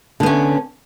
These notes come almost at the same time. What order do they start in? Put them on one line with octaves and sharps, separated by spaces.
D3 B3 C#4